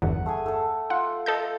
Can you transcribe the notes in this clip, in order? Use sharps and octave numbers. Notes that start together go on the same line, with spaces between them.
G1 E2 F#5
A3 G#4 G#5
A3 A4
F4 F#5
A4 D#5 G6